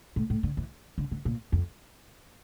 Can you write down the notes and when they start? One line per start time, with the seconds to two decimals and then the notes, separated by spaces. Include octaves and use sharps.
0.16 A2
0.30 A2
0.43 D3
0.57 E3
0.98 D3
1.11 D3
1.25 A#2
1.52 F2